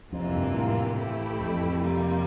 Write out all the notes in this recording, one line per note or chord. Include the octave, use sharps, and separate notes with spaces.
F2 C3 E3 A#3 F4
G2
A2
E3 A3 E4 G4
F2
C3 G3 A#3 F4